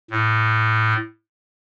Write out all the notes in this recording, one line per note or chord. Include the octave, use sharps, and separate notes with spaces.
A2